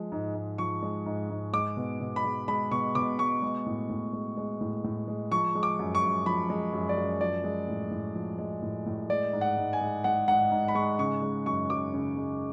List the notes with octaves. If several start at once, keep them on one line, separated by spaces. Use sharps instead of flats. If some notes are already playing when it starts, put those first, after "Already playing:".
Already playing: F3 G#3
G#2
G#2
F3 C#6
G#3
G#2
G#2
G#3 D6
B2
B2
B5
G#3
G#3 B5
B2 C#6
B2 D6
G#3 C#6
G#3
A2
A2
G#3
G#3
A2
A2
G#3
F3 C#6
G#3
D6
F#2
C#6
F#2
F3 B5
G#3
F#2
D5
F#2
F3 D5
G#3
A2
A2
F3
G#3
A2
A2
G#3 D5
G#2
F#5
G#2
G#5
G#3
G#3 F#5
G#2 F#5
G#2
B5
G#3 C#6
C#3 C#6
G#3
F#2 C#6
F#2 D6
C#3
G#3